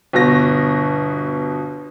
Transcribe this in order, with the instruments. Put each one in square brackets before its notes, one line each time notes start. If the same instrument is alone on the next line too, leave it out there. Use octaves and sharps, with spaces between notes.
[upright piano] G1 B2 A#6